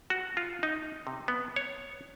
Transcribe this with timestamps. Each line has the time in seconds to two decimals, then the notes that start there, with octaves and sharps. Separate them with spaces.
0.10 F#4
0.37 F4
0.63 D#4
1.07 C3
1.28 B3
1.56 C#5